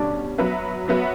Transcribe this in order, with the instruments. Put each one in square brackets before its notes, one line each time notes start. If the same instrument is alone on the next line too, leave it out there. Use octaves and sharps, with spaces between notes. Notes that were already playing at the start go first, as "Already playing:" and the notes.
Already playing: [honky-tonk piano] B2 G3 C#4 [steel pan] D4 D5
[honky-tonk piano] F#3 B3 F#4 B4 E5
F#3 B3 F#4 B4 E5